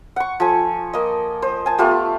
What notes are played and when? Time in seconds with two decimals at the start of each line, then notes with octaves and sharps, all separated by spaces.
0.16 F#5 C#6
0.40 F3 A4 G#5
0.93 A#3 D#5
1.42 C5
1.66 G#5 A5
1.78 A3 B3 F4 G4